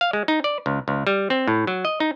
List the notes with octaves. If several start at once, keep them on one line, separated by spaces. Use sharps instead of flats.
F5
G#3
D#4
D5
C#2
C#2
G3
C4
A2
F#3
D#5
D#4